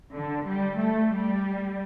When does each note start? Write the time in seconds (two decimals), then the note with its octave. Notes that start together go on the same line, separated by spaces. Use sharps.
0.13 D3
0.45 G3
0.78 A3
1.11 G3